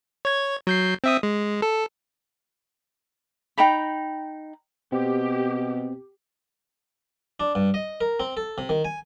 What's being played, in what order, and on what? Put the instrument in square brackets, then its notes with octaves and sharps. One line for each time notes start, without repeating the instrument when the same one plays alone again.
[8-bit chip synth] C#5 G#6
F#3 G6 C7
C4 E5 D#6
G#3
A4
[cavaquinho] D#4 G5 A#5 B5
[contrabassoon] B2 [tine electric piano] C4 [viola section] G4
[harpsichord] D4
G2
D#5
A#4
C4
A4
C3
D#3
G#5